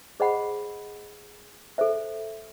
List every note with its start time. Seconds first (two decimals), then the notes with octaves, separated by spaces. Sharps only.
0.20 G#4 C5 D#5 F#5 B5
1.78 A4 C5 E5